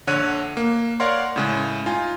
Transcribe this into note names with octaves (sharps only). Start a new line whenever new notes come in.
A#1 D3 C#5 F#5 F#6 D#7
A#3
A#4 C#5 D5 F5 F#5 C6
A2 C#3 G#3
D#4 F4 G#5